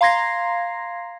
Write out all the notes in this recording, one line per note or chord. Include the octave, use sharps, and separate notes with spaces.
F5 A#5 C6 G#6 A#6 C7